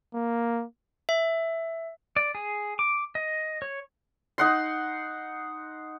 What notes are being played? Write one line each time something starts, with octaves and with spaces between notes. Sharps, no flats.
A#3
E5
D5
G#4
D6
D#5
C#5
D#4 F#5 C6